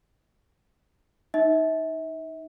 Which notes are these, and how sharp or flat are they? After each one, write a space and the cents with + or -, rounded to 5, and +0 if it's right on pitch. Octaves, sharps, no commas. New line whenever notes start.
D#4 +0 E5 -35